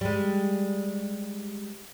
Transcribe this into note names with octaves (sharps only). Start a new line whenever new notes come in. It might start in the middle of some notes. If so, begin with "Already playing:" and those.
G3 G#3